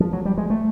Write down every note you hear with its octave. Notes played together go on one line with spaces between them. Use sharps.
F3
F#3
G3
G#3
A3